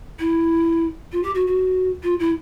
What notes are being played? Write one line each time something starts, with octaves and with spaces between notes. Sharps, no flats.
E4
F4
G4
F#4
F#4
F4
E4